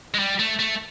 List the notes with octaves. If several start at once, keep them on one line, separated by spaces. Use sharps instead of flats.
G#3
G3
A3
A3